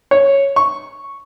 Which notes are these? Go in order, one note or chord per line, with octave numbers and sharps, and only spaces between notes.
C#5
C#6